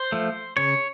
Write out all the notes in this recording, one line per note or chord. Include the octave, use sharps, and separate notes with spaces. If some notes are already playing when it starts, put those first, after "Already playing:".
Already playing: C5
F3 A3
C#3 C#5